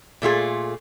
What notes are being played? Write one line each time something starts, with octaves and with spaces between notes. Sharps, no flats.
A#2 A3 F4 G#4